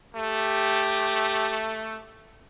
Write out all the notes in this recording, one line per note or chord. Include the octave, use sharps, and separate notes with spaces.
A3 G4